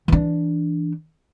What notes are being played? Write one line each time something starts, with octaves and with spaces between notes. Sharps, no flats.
E3 D4